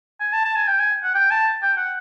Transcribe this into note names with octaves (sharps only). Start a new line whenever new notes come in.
G#5
A5
A5
G#5
G5
G#5
F#5
G5
A5
G5
F#5